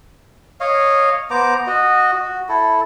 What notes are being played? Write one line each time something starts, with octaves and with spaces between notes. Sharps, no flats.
C#5 D#5 F5
B3 C5 A#5 D6
F#4 D#5
F#4
E4 A4